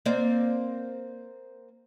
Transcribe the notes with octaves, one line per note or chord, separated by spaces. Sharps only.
A#3 C4 D5